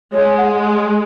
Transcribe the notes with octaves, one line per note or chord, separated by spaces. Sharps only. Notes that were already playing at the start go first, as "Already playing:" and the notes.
G#3 C#5
F#5